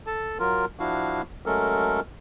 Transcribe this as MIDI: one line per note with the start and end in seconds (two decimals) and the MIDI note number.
0.07 0.38 69
0.07 0.38 81
0.40 0.65 54
0.40 0.65 65
0.40 0.65 70
0.80 1.22 53
0.80 1.22 62
0.80 1.22 64
0.80 1.22 66
0.80 1.22 77
1.46 2.00 54
1.46 2.00 56
1.46 2.00 57
1.46 2.00 61
1.46 2.00 69
1.46 2.00 70